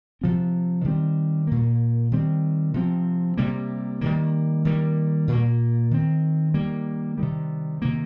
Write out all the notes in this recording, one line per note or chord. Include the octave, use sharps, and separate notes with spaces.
C3 F3 C4
D#3 G3 C4
A#2 A#3
D#3 G3 C4
C3 F3 C4
C3 G3 A#3
D#3 G3 A#3
D#3 G3 A#3
A#2 A#3
D#3 C4
D#3 G3 A#3
C3 D#3 G3
C3 D#3 A#3